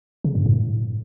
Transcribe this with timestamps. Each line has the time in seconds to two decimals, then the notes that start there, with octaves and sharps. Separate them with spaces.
0.24 C#3
0.35 G2
0.46 A2